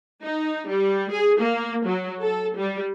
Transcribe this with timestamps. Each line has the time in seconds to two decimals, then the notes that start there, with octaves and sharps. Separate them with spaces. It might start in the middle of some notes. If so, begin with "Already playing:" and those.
0.23 D#4
0.68 G3
1.11 G#4
1.40 A#3
1.87 F#3
2.22 A4
2.56 G3